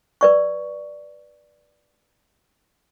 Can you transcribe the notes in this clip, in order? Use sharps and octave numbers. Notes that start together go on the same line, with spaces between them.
B4 D5 C#6